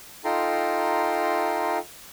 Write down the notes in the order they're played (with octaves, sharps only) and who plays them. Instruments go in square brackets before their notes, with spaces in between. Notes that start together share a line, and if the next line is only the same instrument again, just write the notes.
[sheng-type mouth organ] D#4 F4 A4 G5 A#5 C6